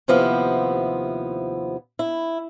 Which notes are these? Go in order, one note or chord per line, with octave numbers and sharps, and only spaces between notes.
D#2 C3 F3 B3 E4 C5
E4